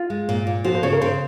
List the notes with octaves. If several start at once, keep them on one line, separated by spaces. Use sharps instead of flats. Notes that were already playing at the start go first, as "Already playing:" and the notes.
Already playing: F4
G#3
A#2
A#2
F3 F#4
C5
C#3 C#5
A#4
C#3 C5